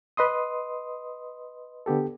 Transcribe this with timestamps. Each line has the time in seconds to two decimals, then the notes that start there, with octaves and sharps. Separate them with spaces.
0.17 B4 D#5 C6 D#6
1.86 D3 B3 G4 A4